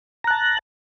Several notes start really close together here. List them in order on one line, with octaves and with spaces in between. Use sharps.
A#5 F#6 A5